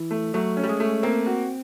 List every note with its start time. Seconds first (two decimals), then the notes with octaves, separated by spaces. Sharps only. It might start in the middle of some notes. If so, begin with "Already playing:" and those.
Already playing: E3
0.11 A3
0.34 F#3 A3
0.57 C#4
0.64 G3
0.69 G#3
0.80 A3
1.03 A#3 C4
1.26 F#4